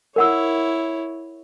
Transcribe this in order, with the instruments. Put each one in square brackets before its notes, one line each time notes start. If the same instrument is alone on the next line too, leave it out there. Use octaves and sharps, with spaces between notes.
[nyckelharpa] E4 C#5 [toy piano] A#4 F#5 E6